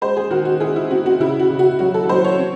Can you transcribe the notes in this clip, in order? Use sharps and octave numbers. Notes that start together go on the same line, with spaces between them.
G#3 C5
G#4
D#3 F#4
F#4
E4 G#4
E4
C4 F#4
F#4
C#3 E4
F#4
C#3
F#4
F#3 F#4
A4
F#3 C5
C#5
C4